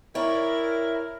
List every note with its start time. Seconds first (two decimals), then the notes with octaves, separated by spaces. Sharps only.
0.15 E4 A#4 C#5 D5 G5